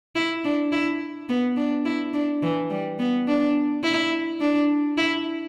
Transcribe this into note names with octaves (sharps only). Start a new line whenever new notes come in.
E4
D4
E4
B3
D4
E4
D4
E3
G3
B3
D4
E4
D4
E4